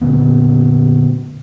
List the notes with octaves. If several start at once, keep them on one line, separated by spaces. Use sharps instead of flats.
A#2 D3 B3